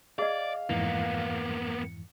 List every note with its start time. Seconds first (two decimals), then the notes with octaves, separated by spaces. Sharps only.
0.19 G#4 D5 D#5 F5
0.70 F2 G#2 E3 A#3 B3